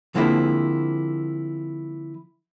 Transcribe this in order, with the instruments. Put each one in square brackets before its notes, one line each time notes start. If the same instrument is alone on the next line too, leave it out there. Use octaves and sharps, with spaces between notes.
[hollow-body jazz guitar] D3 F3 G#3 A#3 C4 E4